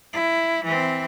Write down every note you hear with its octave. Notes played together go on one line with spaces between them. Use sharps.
E4
E3 C4